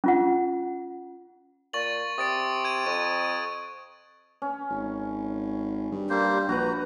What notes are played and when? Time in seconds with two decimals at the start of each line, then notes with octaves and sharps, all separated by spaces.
0.04 C#4 F4 F#5
1.73 A#2 C#6 A6 F#7
2.18 C3 D#6 A6 D7
2.65 G#6 D#7
2.86 F2 C#6 D#7
4.42 C#4
4.70 G#1
5.92 G2
6.10 G3 A#3 C5
6.49 A#1 F#4 B4 A#5